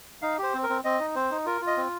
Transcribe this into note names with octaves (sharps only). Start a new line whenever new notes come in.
D#4 F5
G4 C5
C4
A#4
C4
C4 D#5
D#4
C4 C5
D#4
F4 A#4
F4
D#5
C4